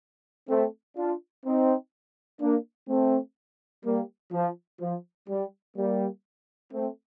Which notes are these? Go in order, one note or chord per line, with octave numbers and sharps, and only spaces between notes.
A3 C4
D4 F4
C4 D#4
A#3 D4
A3 C4
G3 A#3
F3
F3
G3
G3 A#3
A3 C4